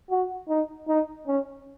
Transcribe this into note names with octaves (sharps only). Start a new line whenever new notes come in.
F#4
D#4
D#4
C#4